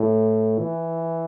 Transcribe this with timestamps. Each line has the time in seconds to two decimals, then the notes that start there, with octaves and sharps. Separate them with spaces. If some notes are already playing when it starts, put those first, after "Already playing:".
Already playing: A2
0.59 E3